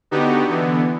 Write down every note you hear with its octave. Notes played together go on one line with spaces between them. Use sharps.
D3 B3 D#4 F#4 G4
D3 E3 B3